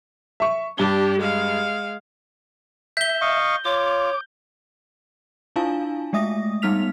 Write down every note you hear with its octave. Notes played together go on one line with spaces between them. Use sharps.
E5 C#6
G2 D4 G4 G7
G#3 F5
E5 G6 G7
D#5 F5 C#6
F4 C#5 D6
D4 E4 F4 F5 G#5 A5
G#3 A3 E5 D#6 A#6
G3 B3 D#4 F6 B6 F7